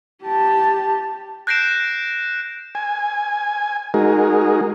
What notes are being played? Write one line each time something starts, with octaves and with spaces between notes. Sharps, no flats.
G4 A5
F#6 G6 A#6 C7 D7 E7
G#5
G#3 D#4 F#4 G#4 A#4